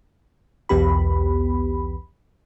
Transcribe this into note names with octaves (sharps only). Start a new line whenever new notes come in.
B1 E2 B3 G4 B5